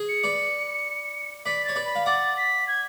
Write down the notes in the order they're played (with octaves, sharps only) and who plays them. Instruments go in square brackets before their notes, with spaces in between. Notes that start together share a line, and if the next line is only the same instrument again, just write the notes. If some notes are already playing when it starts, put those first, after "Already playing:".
Already playing: [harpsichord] G#4
[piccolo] C#7
[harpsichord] B4 D5
[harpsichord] B4 D5 [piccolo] B6
[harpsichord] C#5 [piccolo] A6
[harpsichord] B4 D5
[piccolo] B5
[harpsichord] F5
[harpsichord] D5 F#5 [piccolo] A6
[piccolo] B6
G#6